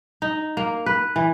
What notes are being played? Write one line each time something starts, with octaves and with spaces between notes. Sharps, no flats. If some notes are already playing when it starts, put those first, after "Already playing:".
D#4
A#3
B4
E3